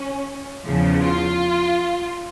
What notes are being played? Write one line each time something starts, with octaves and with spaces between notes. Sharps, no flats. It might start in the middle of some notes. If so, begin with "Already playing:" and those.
Already playing: C#4
E2 C#3 F3
F4